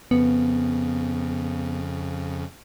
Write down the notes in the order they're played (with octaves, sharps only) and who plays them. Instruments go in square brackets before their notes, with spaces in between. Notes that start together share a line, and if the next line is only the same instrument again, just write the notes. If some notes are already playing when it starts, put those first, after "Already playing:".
[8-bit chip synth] F2 C#3 [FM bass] B3